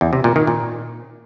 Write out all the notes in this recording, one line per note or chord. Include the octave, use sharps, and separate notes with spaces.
E2
C3
A#2
D#3
A#2